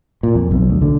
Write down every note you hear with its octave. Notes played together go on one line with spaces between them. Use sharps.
A#2
F2
B1
D2
D3